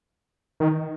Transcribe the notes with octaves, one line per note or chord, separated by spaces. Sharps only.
D#3